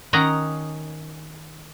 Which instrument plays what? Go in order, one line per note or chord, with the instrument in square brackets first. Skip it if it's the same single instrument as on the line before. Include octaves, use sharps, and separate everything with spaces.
[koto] D#3 C#4 A#4 D#5 F#5 A#5